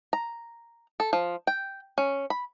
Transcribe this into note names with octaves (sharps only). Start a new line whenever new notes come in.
A#5
A4
F3
G5
C#4
B5